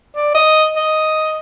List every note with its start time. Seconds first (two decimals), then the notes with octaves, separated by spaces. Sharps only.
0.16 D5
0.34 D#5
0.76 D#5